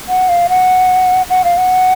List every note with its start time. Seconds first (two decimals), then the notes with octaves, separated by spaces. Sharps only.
0.09 F#5
0.29 F5
0.49 F#5
1.30 F#5
1.45 F5
1.57 F#5